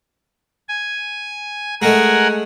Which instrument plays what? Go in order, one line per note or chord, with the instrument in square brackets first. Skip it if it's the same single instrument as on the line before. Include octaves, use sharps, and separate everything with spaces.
[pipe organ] G#5
[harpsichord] G#3 A3 [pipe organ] A#4 F#5 G#5